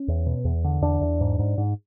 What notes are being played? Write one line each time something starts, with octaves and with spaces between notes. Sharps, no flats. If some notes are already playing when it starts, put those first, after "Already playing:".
Already playing: C#4
E2
B2
E2
D3
E2 D4
E2
G#2
G#2
G#2